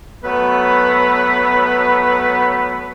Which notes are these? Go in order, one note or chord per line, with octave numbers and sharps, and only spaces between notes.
F#3 A3 B3 B4